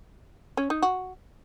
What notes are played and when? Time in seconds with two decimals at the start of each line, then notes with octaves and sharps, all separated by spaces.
0.57 C#4
0.70 D#4
0.82 F#4